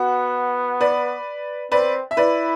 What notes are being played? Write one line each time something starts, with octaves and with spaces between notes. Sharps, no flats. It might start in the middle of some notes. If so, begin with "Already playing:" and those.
Already playing: B3 F#4
B4 D5
C4 B4 D5
E5
E4 B4 D5